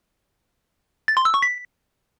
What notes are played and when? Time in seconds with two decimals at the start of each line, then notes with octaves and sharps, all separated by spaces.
1.08 A6
1.17 C6
1.25 E6
1.34 C#6
1.42 B6